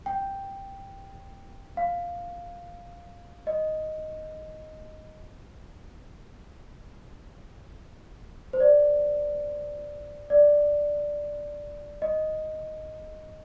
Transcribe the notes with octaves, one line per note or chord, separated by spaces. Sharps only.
G5
F5
D#5
C5
D5
D5
D#5